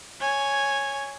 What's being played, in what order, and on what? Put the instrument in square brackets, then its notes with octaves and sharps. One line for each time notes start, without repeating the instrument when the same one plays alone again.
[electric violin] C#5 G#5